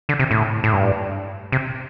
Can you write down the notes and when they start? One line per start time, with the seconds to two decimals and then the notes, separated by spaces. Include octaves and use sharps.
0.09 D3
0.19 C3
0.31 A2
0.64 A2
0.73 G2
1.52 C3